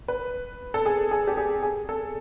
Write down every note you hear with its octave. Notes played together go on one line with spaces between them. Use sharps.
B4
A4
G#4
G#4
G4
G#4
G#4
A4